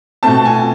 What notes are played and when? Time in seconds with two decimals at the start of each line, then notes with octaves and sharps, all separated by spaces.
0.23 B2 A3 C4 A5
0.45 G#5